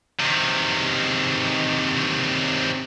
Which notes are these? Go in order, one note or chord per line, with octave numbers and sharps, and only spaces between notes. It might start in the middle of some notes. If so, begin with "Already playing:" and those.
C3 D#3